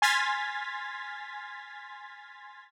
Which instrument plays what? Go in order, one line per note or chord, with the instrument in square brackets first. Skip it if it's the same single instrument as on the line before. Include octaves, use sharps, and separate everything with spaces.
[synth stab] G#5 C6 F6 G#6 A6 B6